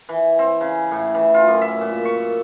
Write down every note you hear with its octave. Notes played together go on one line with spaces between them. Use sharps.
E3
C4
C#3
A2
E3
F4
F#2
E5
A#2
C#6